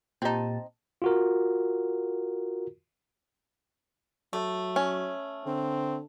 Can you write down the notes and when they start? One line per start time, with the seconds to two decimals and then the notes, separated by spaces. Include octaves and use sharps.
0.22 A#2 C4 D#4 G4 A5
1.02 F4 F#4 A#4
4.33 F#3 A3
4.76 C#4
5.46 D3 C4